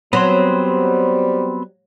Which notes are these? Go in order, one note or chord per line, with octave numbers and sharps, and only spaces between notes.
F#3 G3 B3 C4 C5 C6